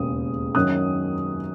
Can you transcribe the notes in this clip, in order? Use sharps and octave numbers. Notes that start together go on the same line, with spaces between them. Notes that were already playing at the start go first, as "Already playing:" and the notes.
Already playing: E1 D#2 C#3 D#6
F#2 D#3 F#3 C#4 D#6 F#6